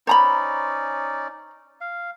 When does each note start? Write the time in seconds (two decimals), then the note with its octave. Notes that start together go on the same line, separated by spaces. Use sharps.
0.07 C#4 D#4 C5 D5 A#5 B5
1.81 F5